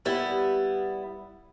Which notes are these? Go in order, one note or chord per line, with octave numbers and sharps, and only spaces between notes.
G3 B3 E4